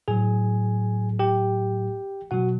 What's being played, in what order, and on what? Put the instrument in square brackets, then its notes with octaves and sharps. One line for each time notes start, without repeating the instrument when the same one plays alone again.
[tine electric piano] A2 F#3 G#4 G#5
G4 G5
B2 F#3 F#4 F#5